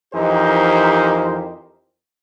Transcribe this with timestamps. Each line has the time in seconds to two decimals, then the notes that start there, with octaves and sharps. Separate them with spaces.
0.14 F2 E3 D#4 G4 A#4 C5